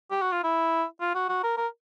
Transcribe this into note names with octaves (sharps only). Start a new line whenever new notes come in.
G4
F#4
F4
E4
F4
F#4
F#4
A#4
A#4